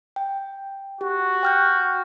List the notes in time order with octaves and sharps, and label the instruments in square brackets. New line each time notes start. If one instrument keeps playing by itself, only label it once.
[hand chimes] G5
[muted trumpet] F#4 [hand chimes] G4
[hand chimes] G5 F6 G6